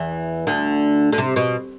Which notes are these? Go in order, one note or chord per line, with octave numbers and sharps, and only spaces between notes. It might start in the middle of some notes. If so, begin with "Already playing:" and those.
Already playing: E2 E3
D2 D3
D3
C3
B2